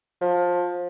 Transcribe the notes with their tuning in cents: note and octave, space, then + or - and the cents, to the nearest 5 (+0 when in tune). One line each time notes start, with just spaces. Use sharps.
F3 +20